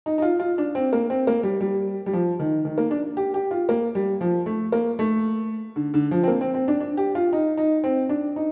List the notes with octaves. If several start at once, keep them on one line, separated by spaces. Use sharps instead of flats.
D#4
D#4
F4
F4
D4
C4
A#3
C4
A#3
G3
G3
G3
F3
D#3
D#3
A#3
D4
G4
G4
F4
A#3
G3
F3
A3
A#3
A3
D3
D3
F3
C4
A#3
C4
C4
D4
D4
G4
F4
D#4
D#4
C4
D4
D#4